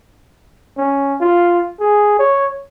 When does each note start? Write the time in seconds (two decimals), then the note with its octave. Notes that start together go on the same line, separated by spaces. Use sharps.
0.77 C#4
1.20 F4
1.80 G#4
2.19 C#5